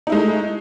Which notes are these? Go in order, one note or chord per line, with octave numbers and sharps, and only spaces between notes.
G#3 A3 D#4 E4